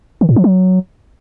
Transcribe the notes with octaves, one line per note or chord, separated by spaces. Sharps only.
D#3
A2
F3
F#3